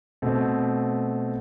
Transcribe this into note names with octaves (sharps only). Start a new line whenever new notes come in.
B2 A3 C4